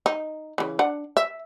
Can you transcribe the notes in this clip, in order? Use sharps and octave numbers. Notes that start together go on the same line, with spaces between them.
D#4
C#3 E3
D4 F#5
E5